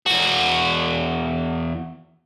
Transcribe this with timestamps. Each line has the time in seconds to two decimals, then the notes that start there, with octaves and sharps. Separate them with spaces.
0.06 E2 F#4